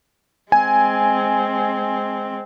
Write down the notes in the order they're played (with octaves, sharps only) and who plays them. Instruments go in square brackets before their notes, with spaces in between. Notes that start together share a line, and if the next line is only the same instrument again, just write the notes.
[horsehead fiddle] G#3 C4 [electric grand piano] G#5